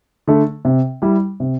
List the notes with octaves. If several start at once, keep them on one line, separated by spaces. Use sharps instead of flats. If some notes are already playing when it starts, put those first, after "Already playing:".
D3 A3
C3
G3 E4
C3